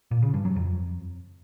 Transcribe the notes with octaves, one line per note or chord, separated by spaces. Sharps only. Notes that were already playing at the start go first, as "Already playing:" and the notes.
A#2
C#3
G2
F#3
F2